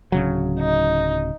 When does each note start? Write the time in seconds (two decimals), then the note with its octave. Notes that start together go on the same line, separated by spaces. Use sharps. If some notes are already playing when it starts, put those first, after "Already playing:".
0.12 D1 C#3 F#3
0.60 D#4